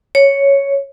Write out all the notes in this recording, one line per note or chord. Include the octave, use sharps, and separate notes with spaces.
C#5